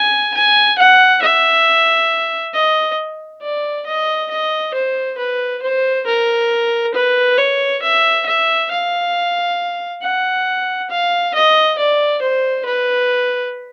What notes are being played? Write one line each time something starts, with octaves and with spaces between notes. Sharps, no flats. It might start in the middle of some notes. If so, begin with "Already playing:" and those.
Already playing: G#5
G#5
F#5
E5
D#5
D5
D#5
D#5
C5
B4
C5
A#4
B4
C#5
E5
E5
F5
F#5
F5
D#5
D5
C5
B4